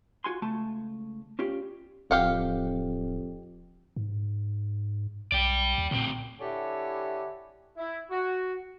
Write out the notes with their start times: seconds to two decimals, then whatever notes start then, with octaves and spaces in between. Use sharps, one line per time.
0.24 F4 F#4 G#5 C6
0.42 C#2 A3 A5
1.39 C#4 F4 G4 D5
2.11 D1 F2 G4 F5 F#5
3.96 G#2
5.32 B1 D5 G5
5.78 D#2
5.91 D2 A#2 C4
6.40 D3 E4 G4 C#5 F#5 G#5
7.77 E4
8.11 F#4